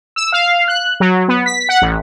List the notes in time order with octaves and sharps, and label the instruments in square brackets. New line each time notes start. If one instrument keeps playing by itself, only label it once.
[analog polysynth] E6
F5
F#6
F#3
B3
B6
F#5
A1